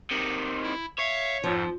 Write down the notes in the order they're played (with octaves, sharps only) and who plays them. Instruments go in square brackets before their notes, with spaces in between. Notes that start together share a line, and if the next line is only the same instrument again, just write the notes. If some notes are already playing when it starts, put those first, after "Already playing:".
[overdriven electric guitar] C3 D#3
[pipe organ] E4
[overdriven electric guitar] C#5 [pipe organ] E5 F5
[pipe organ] F2 G#2 [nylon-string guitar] F3